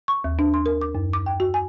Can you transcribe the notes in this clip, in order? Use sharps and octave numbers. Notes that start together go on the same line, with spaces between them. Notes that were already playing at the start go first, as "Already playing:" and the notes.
C#6
D#2
D4
C6
A#4
D6
F#2
D6
G5
F#4
G#5